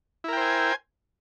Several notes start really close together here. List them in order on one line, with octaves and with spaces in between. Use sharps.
E4 A#4 G5 C5 G#5